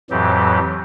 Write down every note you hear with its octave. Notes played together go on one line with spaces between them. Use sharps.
F2 A2 E3 F#3 G4